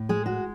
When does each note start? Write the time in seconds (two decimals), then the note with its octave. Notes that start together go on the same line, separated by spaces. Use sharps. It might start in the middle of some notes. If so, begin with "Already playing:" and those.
Already playing: A2
0.09 G#3 G#4
0.26 F#4